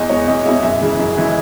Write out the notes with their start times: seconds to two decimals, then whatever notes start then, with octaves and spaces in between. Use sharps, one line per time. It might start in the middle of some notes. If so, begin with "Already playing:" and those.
Already playing: E2 D#5
0.10 B2 G#3 C#5
0.28 E2 D#5
0.45 B2 G#3 E5
0.63 F#2 E5
0.81 C#3 E3 G#3
0.99 F#2
1.17 C#3 E3 G#3